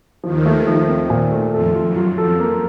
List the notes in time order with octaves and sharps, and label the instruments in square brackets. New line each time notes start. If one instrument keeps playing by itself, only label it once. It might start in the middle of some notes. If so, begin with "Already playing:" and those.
[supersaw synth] D#2 D#3 [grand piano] F3
[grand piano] A3
F3
C4
A#2
A3
[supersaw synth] F2 F3 [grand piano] A4
[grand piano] F4
[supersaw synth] F#2 F#3
[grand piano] F4
[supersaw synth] F2 F3 [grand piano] A4
[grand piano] A#3